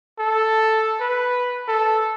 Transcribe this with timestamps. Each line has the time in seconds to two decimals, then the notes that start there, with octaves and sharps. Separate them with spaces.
0.18 A4
1.00 B4
1.68 A4